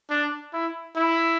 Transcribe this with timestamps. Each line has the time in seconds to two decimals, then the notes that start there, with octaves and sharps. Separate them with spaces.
0.10 D4
0.53 E4
0.96 E4